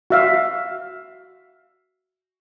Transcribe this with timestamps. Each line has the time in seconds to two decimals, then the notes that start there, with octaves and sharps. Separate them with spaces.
0.10 F#4 E5 F5